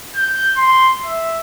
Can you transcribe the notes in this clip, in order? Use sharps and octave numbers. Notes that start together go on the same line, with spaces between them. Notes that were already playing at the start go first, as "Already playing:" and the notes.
G6
C6
E5